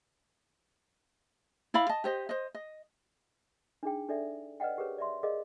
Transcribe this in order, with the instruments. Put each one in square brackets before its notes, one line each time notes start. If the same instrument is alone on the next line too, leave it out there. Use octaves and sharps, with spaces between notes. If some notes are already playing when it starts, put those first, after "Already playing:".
[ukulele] E4 D5 F5 B5
D#5 A5
G4 C5 D#5
C5 D#5
D#5
[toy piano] D4 D#4 G#4 G5
D4 A4 D5 E5
B4 D5 D#5 F#5 G5
G4 G#4 A#4 B4 C#5
D5 E5 C6
G#4 A#4 D5 D#5 F5